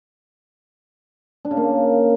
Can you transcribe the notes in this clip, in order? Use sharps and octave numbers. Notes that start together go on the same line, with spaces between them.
D4
C#3
A#3